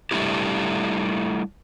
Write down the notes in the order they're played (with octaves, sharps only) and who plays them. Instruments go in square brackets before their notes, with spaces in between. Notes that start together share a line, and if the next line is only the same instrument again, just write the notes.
[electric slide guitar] G3 A3 D4 E4 G4